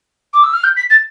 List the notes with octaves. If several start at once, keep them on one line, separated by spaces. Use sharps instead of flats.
D6
E6
F6
G6
B6
A6